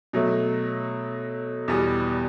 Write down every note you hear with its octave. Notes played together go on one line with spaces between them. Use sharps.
B2 F#3 A3
E2 B2 G3 B3